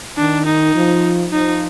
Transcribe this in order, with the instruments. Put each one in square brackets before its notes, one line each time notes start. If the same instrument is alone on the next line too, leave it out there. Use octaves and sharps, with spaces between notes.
[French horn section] D#3 [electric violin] D4
[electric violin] D#4
[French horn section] F3
[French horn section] F3 [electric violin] D#4